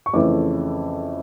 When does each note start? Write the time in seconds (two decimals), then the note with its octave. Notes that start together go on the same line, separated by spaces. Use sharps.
0.06 C#6
0.14 F2 C#3 E3 A3 D6